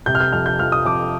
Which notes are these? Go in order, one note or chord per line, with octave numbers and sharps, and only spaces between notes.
C3 G6
F6
G6
F2 F6
G6
F3 F6
D#6
F2 D6